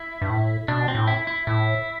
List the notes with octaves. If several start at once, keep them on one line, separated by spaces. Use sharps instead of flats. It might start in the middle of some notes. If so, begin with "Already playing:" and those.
Already playing: E4
G2
A2
B2 D4
C4
A2
E4
E4
A2 E4